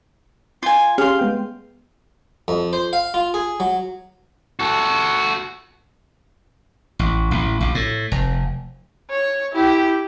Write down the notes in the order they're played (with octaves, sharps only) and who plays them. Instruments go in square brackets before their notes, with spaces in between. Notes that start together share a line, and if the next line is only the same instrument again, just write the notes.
[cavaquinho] F4 G#5
[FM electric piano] C#4 G4 G#4 [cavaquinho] F5 C6
[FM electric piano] G#3 B3 G5
[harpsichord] F2
C5
F5
F4
G#4
F#3
[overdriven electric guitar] F#4 A4
[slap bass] A1
A1
A#1
A2
F1
[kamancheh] C#5
E4 G4